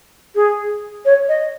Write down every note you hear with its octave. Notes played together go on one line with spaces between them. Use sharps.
G#4
C#5
D#5